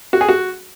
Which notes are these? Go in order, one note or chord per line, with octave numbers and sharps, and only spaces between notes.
F#4
G#4
F#4